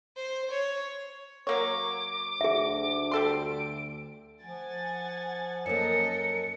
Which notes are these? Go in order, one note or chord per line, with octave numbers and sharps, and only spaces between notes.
C5
C#5
F#3 A#3 C#5 D6
D2 G#4 E5
G3 A4 C6 D7
F3 F#5 G#5 A6
F#2 A#3 A4 A#4 D#5 C#7